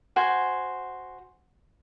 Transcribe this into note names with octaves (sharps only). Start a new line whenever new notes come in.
F#4 C5 G#5